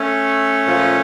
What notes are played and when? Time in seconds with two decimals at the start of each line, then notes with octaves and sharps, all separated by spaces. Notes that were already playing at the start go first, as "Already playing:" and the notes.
Already playing: A3 C#4
0.66 A#2 F3